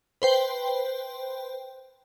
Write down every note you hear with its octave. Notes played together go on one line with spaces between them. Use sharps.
B4 C5 G5